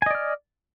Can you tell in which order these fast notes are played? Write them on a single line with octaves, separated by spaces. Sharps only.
G#5 D#5 D5 F6